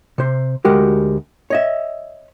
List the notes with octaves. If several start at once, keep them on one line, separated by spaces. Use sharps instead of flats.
C3 C5
D2 G#3 F#4 G4 A#4
C#5 D#5 E5